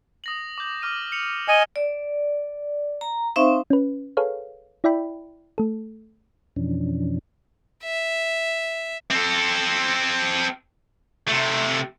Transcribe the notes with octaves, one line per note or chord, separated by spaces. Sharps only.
D#6 A#6 F#7
D6 G6
D6 F6 D#7
C#7 F7 F#7
D#5 G#5 C#7 D#7 E7
D5
A#5
C4 D#4 C5 E5 F5 C#6
C#4 B4
G#4 A4 B4 C#5 F5
E4 D5 E5 G5 B5
A3 A4
F2 B2 E3 F3 C#4 D4
E5
C4 A4
C3 A3